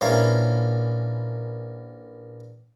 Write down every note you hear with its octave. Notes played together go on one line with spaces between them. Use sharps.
A#1 A#2 E3 C#4 F5 A#5